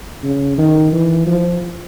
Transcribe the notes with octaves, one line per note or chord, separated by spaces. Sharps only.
C#3
D#3
E3
F3